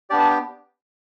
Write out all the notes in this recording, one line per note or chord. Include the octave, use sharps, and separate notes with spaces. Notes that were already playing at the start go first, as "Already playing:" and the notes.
B3 D4 G4 D5
A5
G5